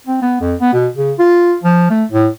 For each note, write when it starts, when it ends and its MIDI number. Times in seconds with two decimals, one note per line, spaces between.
0.07 0.20 60
0.22 0.38 59
0.41 0.55 41
0.60 0.73 59
0.73 0.88 47
0.96 1.13 49
1.19 1.56 65
1.63 1.89 53
1.90 2.04 57
2.12 2.28 45